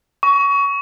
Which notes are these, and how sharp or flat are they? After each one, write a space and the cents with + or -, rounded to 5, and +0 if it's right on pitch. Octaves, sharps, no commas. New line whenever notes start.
C#6 +20